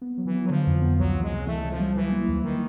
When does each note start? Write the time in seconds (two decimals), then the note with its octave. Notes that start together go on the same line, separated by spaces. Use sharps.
0.01 B3
0.18 F#3
0.26 E3
0.34 B3
0.46 F#3
0.50 D3 F3
0.67 F2
0.82 B3
0.99 C#2 F#3
1.15 E3
1.23 G#3
1.31 C3
1.47 E3 A3
1.63 C3
1.71 F3
1.79 G3
1.96 E3 F#3
2.12 A#3
2.28 D#2
2.43 D#3 A#3